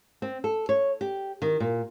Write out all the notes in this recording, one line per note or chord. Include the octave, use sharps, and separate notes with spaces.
C4
A4
C#5
G4
D#3
A#2